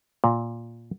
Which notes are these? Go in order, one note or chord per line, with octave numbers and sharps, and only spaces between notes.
A#2